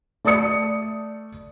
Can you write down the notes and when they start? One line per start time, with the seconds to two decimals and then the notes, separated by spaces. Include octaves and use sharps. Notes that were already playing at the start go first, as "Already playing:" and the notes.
0.25 A3 D5 A5 D#6 C#7